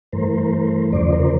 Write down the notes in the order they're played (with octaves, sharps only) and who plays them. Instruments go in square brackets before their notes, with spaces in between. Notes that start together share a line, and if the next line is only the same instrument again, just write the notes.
[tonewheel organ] G2 E3 A3 A#4 C5
E2 C#3 F3 C5 D5
A#4 C5